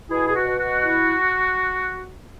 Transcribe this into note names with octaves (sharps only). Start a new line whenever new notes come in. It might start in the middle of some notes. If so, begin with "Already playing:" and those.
B2 E4 G#4
G#4
F#4
B2
F#4
E4